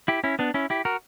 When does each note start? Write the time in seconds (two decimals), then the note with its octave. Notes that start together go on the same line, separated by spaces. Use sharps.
0.08 E4 G4
0.24 C#4 E4
0.39 B3 D4
0.54 C#4 E4
0.70 E4 G4
0.85 F#4 A#4